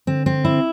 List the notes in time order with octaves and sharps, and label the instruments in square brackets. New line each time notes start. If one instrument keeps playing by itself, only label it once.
[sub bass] D3 [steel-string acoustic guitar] C4
[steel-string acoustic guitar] C4
E4